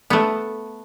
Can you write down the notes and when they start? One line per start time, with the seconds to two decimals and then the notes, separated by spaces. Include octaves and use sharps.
0.10 A3 B3